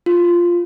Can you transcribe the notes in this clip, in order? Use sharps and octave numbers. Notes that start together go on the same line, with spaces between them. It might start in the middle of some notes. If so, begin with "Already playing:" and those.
F4